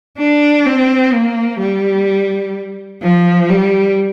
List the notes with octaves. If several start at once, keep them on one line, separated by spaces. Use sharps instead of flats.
D4
C4
A#3
G3
F3
G3